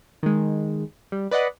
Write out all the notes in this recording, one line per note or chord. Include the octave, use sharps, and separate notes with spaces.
D#3 G#3
G3
B4 D5 D#5 F#5 B5